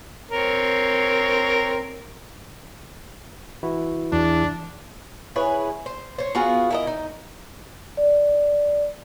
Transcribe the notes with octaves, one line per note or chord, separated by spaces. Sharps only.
C4 A#4 C#5
E3 E4 F#4
E2 D4
E4 G#4 B4 C#5
C5
C5 C#5
B3 F4 F#4 G#4
E4 A#4 D#5
D#4
D5